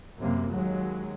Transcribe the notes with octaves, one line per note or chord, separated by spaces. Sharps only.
F#2 C3 A#3
D#2 F#3 G#3